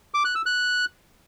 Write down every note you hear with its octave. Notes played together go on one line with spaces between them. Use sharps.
D6
F#6
E6
F#6